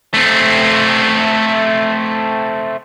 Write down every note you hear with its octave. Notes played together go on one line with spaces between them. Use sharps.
A3 C4